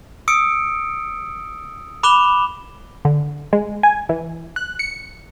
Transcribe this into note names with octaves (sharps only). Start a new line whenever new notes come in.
D#6 E6 C#7 D7
B5 D6 F#6 E7 F7 G7
D3
G#3
G#5
E3
F#6
C#7